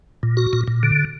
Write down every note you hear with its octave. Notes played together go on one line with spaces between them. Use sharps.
A#2
F#4
A#2
A#2
D3